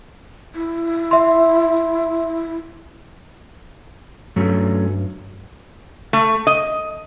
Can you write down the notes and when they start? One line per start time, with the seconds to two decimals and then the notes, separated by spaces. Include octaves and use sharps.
0.55 E4
1.11 E5 C6
4.36 G2 F#3 A3 C#4
6.13 A3
6.47 D#5